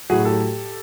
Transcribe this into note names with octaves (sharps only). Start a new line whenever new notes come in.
A2 F#3 F#4 G#4
G4 A4